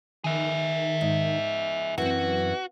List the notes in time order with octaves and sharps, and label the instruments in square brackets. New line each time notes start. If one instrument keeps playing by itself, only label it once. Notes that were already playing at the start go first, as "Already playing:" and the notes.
[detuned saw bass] D#3 [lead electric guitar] G#4 E5
[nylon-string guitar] G#2
[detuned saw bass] F#2 [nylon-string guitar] E3 C4 [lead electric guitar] F#4